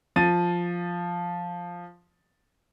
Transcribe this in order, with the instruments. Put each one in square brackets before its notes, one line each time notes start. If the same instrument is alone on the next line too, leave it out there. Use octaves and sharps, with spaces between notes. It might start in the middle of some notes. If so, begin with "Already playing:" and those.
[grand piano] F3 A6 D#7